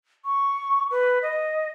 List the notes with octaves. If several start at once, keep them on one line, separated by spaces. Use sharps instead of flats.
C#6
B4
D#5